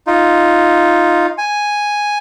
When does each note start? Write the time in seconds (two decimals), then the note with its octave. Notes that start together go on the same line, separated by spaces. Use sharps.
0.07 D#4 F4
1.38 G#5